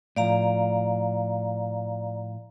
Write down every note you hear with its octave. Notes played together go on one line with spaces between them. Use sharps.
A2 F3 D5 F5 A#5